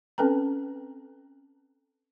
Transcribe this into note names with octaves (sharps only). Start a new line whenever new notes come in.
C4 C#4 A4 B4 G5 A#5